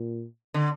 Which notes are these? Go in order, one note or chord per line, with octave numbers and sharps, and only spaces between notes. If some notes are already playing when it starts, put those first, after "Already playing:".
Already playing: A#2
D3